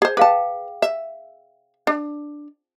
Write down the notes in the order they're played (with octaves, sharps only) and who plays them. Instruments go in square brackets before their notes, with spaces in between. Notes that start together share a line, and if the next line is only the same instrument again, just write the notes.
[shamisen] G#4 C5
[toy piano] G#4 F5 G5 [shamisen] B4 A5
[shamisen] E5
D4